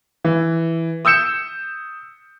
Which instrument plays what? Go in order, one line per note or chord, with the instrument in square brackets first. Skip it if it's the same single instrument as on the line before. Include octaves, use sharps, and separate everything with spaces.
[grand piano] E3
D#6 E6 G6 C#7 E7